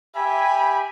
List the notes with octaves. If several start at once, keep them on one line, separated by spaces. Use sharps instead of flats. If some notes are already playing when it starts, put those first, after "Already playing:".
G4 E5 G#5 B5